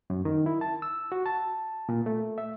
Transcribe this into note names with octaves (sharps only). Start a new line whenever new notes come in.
F#2
D#3
E4
A5
E6
F#4
A5
A#2
A3
E5